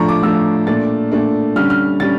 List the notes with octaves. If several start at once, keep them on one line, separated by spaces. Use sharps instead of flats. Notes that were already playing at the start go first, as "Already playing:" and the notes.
Already playing: A2 F3 A3 D4 A#5 C#6
D6
A2 F3 A3 D4 E6
A#2 A3 D4 A6
A#2 A3 D4
D3 G3 C#4 F6
F6
D3 G3 C#4 A6